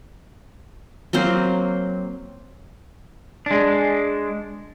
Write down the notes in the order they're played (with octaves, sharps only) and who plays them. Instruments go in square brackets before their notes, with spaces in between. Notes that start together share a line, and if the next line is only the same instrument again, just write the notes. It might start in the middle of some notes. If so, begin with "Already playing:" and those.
[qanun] F#3 A#3 C4 C5
[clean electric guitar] G#3 D4